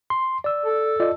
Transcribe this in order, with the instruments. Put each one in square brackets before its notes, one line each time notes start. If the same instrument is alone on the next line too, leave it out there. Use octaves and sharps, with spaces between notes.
[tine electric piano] C6
D5 E6
[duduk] A4
[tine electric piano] F4 D5 D#5